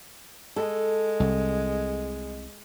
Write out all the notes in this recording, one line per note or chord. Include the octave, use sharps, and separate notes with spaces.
G#3 A4
C2